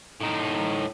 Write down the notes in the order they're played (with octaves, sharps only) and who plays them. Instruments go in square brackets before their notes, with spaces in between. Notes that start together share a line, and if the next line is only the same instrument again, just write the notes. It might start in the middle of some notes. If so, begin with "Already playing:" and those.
[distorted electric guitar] A2 D#4